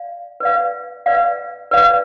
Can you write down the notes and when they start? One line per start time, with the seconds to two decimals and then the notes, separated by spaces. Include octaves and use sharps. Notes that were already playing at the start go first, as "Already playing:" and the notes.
Already playing: D5 F5
0.40 B4 D5 F5
1.06 B4 D5 F5
1.71 B4 D5 F5